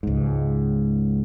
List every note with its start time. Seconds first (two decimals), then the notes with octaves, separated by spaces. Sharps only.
0.03 C#2 G#2